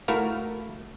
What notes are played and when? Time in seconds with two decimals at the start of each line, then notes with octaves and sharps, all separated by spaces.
0.08 A3 E4 F#4 A#4 F5